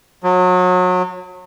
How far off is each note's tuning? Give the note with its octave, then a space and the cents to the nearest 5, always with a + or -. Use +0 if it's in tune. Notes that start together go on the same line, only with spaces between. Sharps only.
F#3 -30